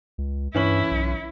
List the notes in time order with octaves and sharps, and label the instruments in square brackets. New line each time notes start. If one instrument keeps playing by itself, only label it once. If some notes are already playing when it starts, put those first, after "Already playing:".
[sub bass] C#2
[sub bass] G2 [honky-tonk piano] E3 C#4 F#7 [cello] E4
[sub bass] B1